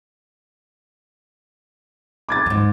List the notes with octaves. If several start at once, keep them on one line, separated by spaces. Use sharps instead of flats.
D6 G#6 A6
F2 G#2